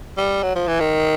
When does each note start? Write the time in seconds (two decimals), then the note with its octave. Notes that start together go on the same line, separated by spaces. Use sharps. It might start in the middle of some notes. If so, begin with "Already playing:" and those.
0.17 G3
0.43 F#3
0.55 F3
0.67 E3
0.80 D#3